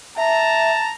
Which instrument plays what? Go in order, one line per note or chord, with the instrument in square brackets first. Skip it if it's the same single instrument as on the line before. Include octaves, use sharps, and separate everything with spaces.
[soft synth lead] E5 [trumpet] A5 [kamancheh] A#5